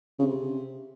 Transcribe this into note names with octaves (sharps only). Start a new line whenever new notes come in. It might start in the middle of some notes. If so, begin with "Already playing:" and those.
C#3
C3